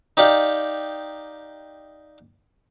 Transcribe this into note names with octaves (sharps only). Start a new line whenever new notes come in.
D#4 G4 D5 F5